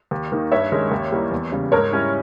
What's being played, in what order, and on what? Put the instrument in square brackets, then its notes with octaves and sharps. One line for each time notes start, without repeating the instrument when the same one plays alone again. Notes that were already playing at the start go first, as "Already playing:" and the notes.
[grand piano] D#2
D#3 A#3 D#4
[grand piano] G2 [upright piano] C#5 E5
[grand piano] D#3 G#3 C#4
D#2
D#3 G3 A#3 E4
E2
C#3 G3
[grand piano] G#2 [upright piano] A#4 C#5
[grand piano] G3 C#4 E4